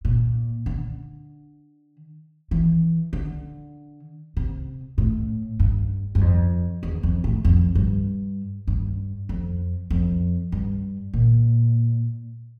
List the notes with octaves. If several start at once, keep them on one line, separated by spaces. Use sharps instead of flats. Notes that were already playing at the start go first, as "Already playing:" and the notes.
A#2
D3
E3
D3
C3
A2
G2
G2
F2
E2
F2
A2
F2
G2
G2
F2
F2
G2
A#2